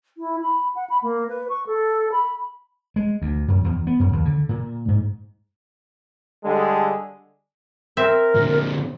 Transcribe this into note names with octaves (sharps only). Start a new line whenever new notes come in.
E4
B5
F#5
B5
A#3
B4
C#6
A4
B5
G#3
D2
F#2
E2
B3
F#2
D#2
D3
A#2
G#2
D3 G3 G#3 G#4 A4
C4 A#4 E5
A#2 D3